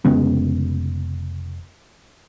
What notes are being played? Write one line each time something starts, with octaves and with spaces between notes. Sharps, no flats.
F1 C#3 G#3 B3